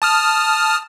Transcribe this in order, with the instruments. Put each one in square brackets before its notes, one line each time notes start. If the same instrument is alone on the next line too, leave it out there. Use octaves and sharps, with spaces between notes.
[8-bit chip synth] A5 D#6 F6